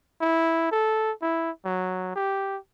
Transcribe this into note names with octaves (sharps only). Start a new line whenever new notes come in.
E4
A4
E4
F#3
G4